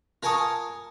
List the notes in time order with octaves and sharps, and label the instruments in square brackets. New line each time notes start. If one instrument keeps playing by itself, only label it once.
[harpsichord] F4 A#4 G#5 A5 C#6 D#6